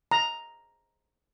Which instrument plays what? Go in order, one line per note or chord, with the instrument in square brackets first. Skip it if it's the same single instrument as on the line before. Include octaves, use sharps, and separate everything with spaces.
[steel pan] A#5